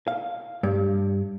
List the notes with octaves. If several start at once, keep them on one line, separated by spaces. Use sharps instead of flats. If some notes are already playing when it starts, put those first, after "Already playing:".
F5
G2